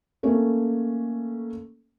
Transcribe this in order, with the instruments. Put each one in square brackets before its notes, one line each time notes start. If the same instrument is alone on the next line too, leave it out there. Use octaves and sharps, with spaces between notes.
[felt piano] A3 A#3 C#4